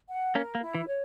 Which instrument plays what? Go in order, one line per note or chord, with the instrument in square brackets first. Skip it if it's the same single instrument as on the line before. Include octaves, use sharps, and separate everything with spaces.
[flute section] F#5
[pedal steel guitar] A#3 C#4 [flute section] A#4
[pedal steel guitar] A#3
[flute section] E4
[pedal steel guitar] E3
[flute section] C#5